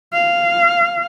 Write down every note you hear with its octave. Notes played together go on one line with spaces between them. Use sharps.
F5